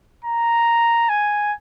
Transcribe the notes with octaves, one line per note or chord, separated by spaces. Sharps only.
A#5
G#5